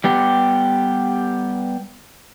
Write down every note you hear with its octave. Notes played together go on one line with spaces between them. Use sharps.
G3 B3 G4